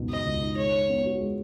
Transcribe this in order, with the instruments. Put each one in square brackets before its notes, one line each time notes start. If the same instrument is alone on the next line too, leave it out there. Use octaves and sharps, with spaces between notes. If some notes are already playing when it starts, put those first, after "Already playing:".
Already playing: [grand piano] C#2 F#2 B2 D#4
[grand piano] G#3 [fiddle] D#5
[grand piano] C#2
D#4
[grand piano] G#3 [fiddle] C#5
[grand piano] G#3
B3
F#4
G#3